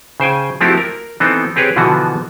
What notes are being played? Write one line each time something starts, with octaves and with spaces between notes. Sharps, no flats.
C#3 C5 G5 G#5
F3 A3 C4 E4 F#4 G4
A#4
E3 B3 C4 D#4 A4
C4 G4 G#4 B4 C#5
B2 D3 E3 F3 B3 F#4